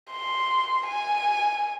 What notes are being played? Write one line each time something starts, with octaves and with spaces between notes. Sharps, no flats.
C6
G#5